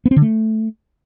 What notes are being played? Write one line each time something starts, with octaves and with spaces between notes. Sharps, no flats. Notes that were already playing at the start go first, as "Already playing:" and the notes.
B3
C4
D3
A3